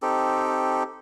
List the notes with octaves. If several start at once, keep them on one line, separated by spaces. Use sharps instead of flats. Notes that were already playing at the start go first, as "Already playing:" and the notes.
C4 D#4 G4 A4